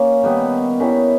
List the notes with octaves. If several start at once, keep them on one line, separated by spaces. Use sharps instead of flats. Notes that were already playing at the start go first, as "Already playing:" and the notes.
Already playing: A#3 C#4
D#3 G3 B3
D#3 G3 C#4 E4